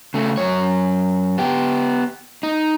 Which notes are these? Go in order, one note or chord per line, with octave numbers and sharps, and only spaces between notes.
C#3 A3
F#2 C#5
B3 G4
D#4